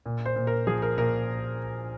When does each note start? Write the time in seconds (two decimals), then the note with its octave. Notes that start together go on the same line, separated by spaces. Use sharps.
0.06 A#2
0.26 C5
0.36 A#2
0.47 A#4
0.67 F3 G#4
0.82 A#4
0.98 A#2 A#4